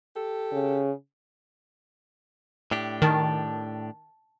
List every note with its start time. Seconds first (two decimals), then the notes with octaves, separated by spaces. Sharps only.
0.15 G4 A4
0.52 C#3
2.71 A2 D4 G4
3.02 D#3 A5